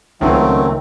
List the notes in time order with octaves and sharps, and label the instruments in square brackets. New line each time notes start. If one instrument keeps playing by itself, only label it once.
[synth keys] C#2 D#3 [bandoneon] F#3 A3 C4